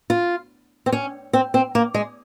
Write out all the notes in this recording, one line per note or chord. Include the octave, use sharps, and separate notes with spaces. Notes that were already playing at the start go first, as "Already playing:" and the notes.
F4
C4
C#4
C4
C4
A#3
G#3